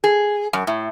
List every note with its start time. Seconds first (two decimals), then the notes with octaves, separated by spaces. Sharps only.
0.04 G#4
0.53 F#2
0.67 A2